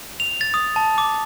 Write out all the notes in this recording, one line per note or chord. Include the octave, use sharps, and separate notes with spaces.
F7
A6
D#6
A5
D6